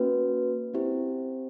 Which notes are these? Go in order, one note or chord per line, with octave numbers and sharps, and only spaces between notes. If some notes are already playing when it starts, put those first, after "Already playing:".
Already playing: A#3 C#4 F#4 B4
C4 E4 G4 C5 E5